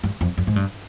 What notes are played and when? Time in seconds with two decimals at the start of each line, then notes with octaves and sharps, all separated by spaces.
0.03 G2
0.21 F2
0.38 F#2
0.47 G#2
0.56 G2